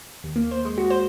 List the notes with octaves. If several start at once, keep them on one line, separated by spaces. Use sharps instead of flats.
D#2
A#3
C5
G#3
F#4
C5